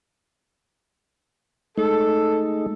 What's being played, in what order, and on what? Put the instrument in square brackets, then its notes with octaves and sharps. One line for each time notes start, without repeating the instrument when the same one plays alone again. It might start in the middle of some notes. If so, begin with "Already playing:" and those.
[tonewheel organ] G#3 A3 D#4 [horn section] A4